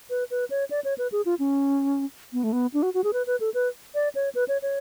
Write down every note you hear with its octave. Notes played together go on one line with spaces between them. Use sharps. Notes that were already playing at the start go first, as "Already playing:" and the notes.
B4
B4
C#5
D5
C#5
B4
G#4
F4
C#4
B3
A3
B3
D4
F#4
F#4
G#4
B4
B4
A4
B4
D5
C#5
B4
C#5
C#5